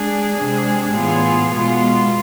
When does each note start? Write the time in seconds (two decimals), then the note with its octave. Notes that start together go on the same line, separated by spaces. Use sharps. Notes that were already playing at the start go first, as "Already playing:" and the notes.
Already playing: G#3 D4 G#4
0.35 C3 G#3 D4 G#4
0.93 A2 E3 B3 F4 G#4
1.50 B2 G#3 B3 F4